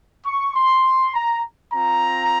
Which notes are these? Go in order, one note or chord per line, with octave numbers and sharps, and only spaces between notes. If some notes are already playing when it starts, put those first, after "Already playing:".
C#6
C6
A#5
C4 F4 A#5